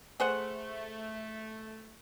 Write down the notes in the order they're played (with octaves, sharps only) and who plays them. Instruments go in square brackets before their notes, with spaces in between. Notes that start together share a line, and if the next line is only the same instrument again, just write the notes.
[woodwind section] A3 [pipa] G#4 C5 F#5